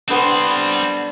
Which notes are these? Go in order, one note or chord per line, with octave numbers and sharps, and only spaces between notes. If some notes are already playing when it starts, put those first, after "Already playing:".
D3 G3 B3 C4 C5